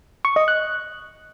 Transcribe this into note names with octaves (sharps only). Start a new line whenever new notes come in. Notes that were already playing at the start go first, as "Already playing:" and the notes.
C#6
D#5
F#6